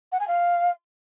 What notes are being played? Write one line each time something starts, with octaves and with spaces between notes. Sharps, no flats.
F#5
G#5
F5